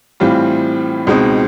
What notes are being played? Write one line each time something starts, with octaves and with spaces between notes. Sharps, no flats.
A2 E3 G3 C4 F4
C#2 B2 G#3 C4 D#4